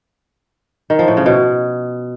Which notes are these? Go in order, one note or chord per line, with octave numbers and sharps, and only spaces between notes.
D#3
F3
A2
C#3
B2